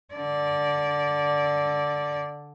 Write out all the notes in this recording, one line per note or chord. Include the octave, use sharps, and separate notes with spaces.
D3 D5